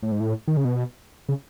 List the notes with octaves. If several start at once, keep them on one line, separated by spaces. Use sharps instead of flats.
A2
G#2
A2
D#3
C#3
B2
C#3